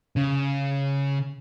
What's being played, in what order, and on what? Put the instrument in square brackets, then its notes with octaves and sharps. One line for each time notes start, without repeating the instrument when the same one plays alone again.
[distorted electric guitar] C#3